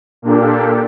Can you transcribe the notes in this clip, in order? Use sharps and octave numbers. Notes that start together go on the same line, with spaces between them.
A#2 A#3 D4 G4 A4